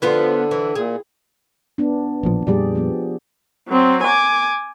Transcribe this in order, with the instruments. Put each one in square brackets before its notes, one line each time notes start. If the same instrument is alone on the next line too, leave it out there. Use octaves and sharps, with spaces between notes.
[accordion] D3 [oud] F3 B3 F4
[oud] E3
[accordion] A#2 [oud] G#4
[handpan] B3 D4
[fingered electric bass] A1 A#2 F3
[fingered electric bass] F2 A#2 G3 [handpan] G4 G#4 D5
[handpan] F3 B3
[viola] F#3 C4
G#5 D6